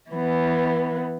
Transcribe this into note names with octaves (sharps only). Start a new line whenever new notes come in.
E3 B3